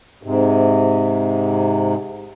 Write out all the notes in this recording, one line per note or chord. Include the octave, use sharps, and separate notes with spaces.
G#2 C3